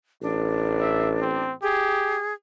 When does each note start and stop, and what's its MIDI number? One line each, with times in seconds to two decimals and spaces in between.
0.22 1.60 33
0.22 1.45 62
0.81 1.10 76
1.22 1.53 60
1.62 2.18 67
1.62 2.33 68